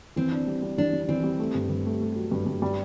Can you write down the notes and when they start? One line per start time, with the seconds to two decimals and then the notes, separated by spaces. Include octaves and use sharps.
0.16 E3 C4
0.32 D4
0.47 G3
0.62 G3
0.78 E3 D4
0.93 G3
1.08 E3 C4
1.23 G3
1.39 A3
1.55 G2
1.69 G2
1.86 A3
2.01 A3
2.16 F#3
2.31 G2
2.46 G2
2.62 G3